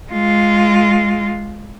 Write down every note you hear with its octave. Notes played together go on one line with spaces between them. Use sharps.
G#3 F4